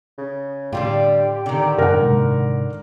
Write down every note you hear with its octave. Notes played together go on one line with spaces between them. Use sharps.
C#3
A2 D3 G3 F4 G4
D3 D#3
F#2 A2 C#3 A#4 F#5
G#2 C3 G#3